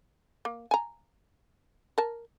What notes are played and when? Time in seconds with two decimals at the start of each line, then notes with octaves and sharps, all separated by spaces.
0.45 A#3
0.71 G#5 A#5
1.98 A#4 A5